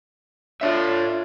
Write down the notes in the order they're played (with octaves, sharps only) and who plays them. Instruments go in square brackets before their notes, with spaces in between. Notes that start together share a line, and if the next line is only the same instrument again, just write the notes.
[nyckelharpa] D4 F4 [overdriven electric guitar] C#5 E5